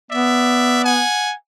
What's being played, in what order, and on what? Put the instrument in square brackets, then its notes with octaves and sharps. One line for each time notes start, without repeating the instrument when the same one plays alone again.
[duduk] B3 [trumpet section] D5 E5
[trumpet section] F#5 G#5